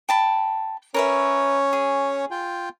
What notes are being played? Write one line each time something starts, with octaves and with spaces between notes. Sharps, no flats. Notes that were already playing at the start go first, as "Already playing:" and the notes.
G5 A5 B5
C#4 A#4 B4 C#5 E5
G#4
F4 G5